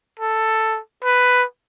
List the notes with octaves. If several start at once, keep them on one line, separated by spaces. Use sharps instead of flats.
A4
B4